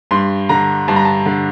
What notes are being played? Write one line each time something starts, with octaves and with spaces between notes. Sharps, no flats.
G2 C6
D3 A#5
G2 A5
A#5
A5
D3